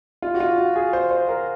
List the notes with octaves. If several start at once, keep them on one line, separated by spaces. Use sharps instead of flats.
F4
F#4
F4
F#4
G#4
C5
C5
A#4